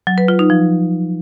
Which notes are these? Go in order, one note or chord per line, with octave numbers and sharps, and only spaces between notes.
F#3
B4
F4
D#4
F3